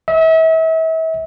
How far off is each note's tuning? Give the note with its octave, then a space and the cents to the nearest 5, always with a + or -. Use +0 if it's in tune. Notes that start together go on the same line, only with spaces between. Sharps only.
E5 -35